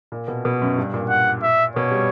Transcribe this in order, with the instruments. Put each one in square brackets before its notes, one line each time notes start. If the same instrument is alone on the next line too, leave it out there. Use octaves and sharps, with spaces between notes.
[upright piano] A#2
B2
B2
F#2
G2
A#2
[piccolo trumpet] F#5
E5
[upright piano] B2 [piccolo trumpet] C#5
[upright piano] G3